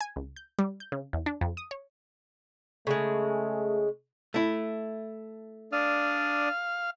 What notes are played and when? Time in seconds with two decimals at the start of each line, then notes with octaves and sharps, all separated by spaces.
0.01 G#5
0.16 C#2
0.36 G6
0.59 G3
0.80 G6
0.92 C#3
1.13 E2
1.26 D4
1.41 F2
1.57 D#6
1.71 C#5
2.87 C#3 G#3 A3
4.34 A3 E4
5.73 D4 D5 F5 D#6